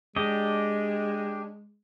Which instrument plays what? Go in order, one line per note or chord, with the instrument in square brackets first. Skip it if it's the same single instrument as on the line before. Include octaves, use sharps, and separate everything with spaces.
[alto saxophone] G#3 [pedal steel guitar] D4 G4 D#5